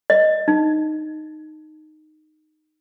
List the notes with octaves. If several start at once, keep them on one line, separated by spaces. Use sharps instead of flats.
D#5
D#4